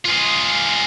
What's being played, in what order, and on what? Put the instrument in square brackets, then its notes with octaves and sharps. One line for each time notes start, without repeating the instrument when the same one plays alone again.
[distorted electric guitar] F4 G#4